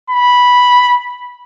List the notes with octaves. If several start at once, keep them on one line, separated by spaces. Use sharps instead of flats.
B5